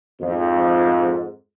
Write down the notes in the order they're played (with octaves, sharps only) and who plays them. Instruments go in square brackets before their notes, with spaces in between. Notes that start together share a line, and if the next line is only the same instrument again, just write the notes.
[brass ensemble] F2 G#2